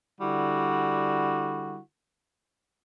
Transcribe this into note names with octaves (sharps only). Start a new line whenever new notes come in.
D3 G3 E4 F#4